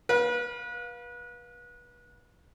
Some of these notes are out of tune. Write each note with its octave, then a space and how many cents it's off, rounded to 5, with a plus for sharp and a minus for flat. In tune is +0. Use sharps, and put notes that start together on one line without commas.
B4 -30 F5 +20